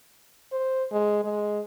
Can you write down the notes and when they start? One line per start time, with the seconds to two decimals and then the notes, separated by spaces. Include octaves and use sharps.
0.52 C5
0.92 G#3
1.24 G#3